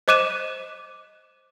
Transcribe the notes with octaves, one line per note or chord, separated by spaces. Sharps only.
C5 D#5 D6 F#6 D#7 E7